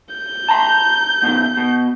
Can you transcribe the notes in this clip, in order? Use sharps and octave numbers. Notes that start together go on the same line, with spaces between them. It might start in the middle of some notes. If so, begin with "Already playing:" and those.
G6
A5 A#5 C6
B2 D#3
B2